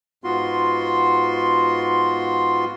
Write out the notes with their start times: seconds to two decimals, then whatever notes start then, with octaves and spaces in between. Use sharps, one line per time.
0.24 G#2 B3 F4 F#4 C6